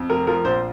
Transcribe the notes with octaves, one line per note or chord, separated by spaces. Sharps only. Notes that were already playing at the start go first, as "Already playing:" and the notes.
Already playing: F2
F1 A#4
F3 A#4
A#1 C5